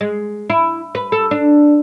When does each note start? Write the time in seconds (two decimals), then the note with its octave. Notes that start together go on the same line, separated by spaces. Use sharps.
0.01 G#3
0.50 E4
0.95 B4
1.12 A4
1.31 D4